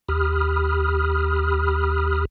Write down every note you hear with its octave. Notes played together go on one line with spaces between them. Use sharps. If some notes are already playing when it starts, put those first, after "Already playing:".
D#2 G4 B5 D#6 F6